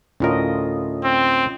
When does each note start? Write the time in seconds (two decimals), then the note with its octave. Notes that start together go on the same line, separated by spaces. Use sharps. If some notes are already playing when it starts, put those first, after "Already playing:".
0.20 D2 A2 C#4 F4 A#4 D#5
1.04 C4